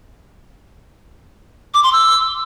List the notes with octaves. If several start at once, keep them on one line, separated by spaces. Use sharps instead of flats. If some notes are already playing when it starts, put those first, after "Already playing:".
D6
C6
E6